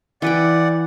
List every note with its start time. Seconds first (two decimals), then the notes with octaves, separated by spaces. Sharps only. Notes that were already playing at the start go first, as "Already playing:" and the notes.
0.22 E3 B4 D5 F#5 G5